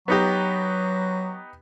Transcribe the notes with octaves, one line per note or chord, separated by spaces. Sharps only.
F#3 B3 D#4 G4